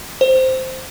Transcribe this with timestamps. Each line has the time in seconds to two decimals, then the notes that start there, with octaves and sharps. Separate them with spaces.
0.21 C5